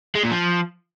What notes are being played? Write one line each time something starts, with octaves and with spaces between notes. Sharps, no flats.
G#3
A#2
F3